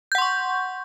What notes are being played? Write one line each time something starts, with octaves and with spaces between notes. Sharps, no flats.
F#5 C6 C#6 G6